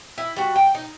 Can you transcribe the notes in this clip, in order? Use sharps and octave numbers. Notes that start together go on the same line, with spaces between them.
E4
G3 F#4
G5
D#4